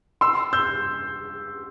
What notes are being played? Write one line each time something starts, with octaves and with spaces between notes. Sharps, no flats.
C6 E6
E6 G6